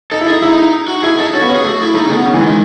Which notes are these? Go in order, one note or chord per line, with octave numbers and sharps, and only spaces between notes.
D#4 A4
E4
D#4 G#4
D#4 E4
D#4
F#4
E4 G#4
D#4 A4
C#4 F#4
B3
C#4
G#4
A3
F#4
E4
A3 D#4
C#3
D#3 B3
C#3
E3 G#3
D#3
G#3